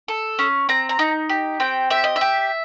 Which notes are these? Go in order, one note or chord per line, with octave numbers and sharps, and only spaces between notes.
A4
C#4
C4 A#5
A#5
D#4
G4
C4 G5
G4 E5
D#5
E5
G4